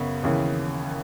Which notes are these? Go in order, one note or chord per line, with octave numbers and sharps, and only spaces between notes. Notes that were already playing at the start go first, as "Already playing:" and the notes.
Already playing: F#2 C#3 B3
D#2 C#3 E3